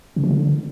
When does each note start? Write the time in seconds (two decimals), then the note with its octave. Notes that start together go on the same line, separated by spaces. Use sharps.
0.16 C#3
0.24 F3
0.31 D3